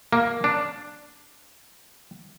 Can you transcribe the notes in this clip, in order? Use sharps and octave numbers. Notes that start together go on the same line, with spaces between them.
A#3
D4